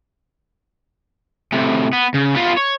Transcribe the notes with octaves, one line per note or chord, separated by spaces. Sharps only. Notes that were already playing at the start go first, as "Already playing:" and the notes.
A2 C3
B3
C#3
B3 F4
C#5